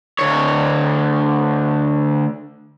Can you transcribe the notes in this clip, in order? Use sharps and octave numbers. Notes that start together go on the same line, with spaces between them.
D2 C#5